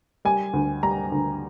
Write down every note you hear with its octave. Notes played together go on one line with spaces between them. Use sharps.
G3 G#5
D2
G3 A#5
D2